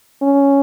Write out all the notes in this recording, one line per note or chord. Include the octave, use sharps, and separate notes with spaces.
C#4